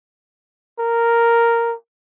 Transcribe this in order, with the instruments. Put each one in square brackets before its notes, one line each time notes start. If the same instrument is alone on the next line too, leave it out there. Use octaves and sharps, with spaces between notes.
[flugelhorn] A#4